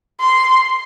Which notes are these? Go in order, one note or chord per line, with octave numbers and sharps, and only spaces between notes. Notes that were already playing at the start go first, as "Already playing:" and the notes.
C6